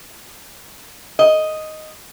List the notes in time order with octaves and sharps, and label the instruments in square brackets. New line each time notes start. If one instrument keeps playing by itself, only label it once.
[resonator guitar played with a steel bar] D#5